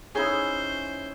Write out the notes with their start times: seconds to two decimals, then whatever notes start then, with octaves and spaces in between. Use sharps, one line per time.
0.15 C#4 D#4 E4 G#4 C5